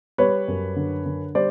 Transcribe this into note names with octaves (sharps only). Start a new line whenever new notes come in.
G3 B4 C#5
F#2
D3
D3
G3 C5 D5